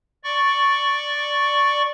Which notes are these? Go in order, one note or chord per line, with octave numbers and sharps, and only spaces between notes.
D5 C#6